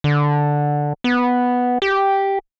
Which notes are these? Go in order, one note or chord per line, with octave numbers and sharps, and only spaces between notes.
D3
B3
G4